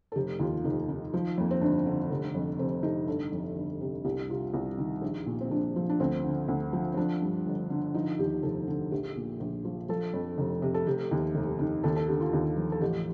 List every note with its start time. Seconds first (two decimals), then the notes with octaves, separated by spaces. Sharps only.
0.12 A4
0.16 F1 G4
0.39 D#2 F4
0.64 F1 D#4
0.89 D#3
1.14 F3
1.38 F2 A#3
1.51 C4
1.61 G1 D4
1.86 D3
2.10 F1
2.35 F2
2.59 F1 C4
2.83 C3 D#4
3.07 G1 A4
3.32 F2
3.56 G1
3.81 C3
4.05 C2 G4
4.30 C3 F4
4.54 C2
4.78 D#3
5.02 A#1
5.26 A#2
5.41 C4
5.51 A#1 D4
5.76 F3
5.90 D4
6.00 D2 C4
6.24 D3
6.48 D2
6.73 F3
6.93 C4
6.97 F3 D4
7.22 G2
7.46 G1
7.70 D3
7.94 F3 D#4
8.19 D#2 G4
8.43 F1 A4
8.68 D3
8.91 A#1 G4
9.16 A#2
9.40 A#1
9.65 F3
9.89 F3 A4
10.14 F2
10.38 F1
10.62 C3
10.74 A4
10.87 F1 G4
11.11 D#2
11.35 F1
11.59 D#3
11.84 D#2 A4
11.96 A4
12.08 D3 G4
12.20 F4
12.33 D#2
12.57 F3
12.72 A4
12.81 A1 G4